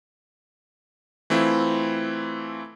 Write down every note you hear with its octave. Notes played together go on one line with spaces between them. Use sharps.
E3 A3 C4 E4 F4